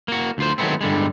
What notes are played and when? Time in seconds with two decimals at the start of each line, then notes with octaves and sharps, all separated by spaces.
0.08 A#3 F#4
0.38 D2 F4 C5
0.58 D#3 F#3 G#3 A3 B3 C4
0.81 G2 D3 G3 G#3